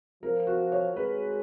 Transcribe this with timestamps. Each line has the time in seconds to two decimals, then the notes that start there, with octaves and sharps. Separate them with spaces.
0.23 F3 A#4
0.47 F#4
0.72 C#5
0.96 G#3 B4